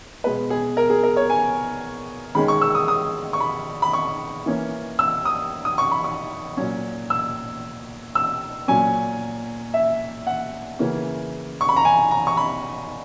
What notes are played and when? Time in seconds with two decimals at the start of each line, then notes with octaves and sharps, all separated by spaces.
0.24 B2 G#3 B3 B4
0.50 G#4
0.77 A#4
0.90 G#4
1.03 A#4
1.16 C#5
1.30 G#5
2.35 D#3 G#3 C#4 B5
2.48 C#6
2.62 E6
2.75 D#6
2.88 D#6
3.33 C#6
3.40 B5
3.82 B5
3.93 C#6
4.46 E3 A#3 C#4
4.99 E6
5.25 D#6
5.65 D#6
5.78 C#6
5.92 B5
6.04 C#6
6.57 A#2 F#3 C#4
7.10 E6
8.15 E6
8.68 A#2 F#3 C#4 G#5
9.74 E5
10.27 F#5
10.79 C#3 E3 A#3 C#4
11.61 C#6
11.69 B5
11.76 A#5
11.85 G#5
12.11 A#5
12.27 C#6
12.37 B5